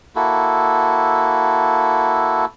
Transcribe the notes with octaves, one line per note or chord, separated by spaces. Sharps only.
A#3 E4 F#4 A4